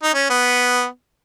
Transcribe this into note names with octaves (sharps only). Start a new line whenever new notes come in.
D#4
C#4
B3